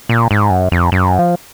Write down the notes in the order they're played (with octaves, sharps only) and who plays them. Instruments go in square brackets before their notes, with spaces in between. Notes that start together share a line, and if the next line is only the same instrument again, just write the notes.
[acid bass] A#2
G#2
F#2
F2
F#2
F3